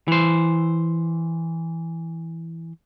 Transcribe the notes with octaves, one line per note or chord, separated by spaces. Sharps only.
E3 C5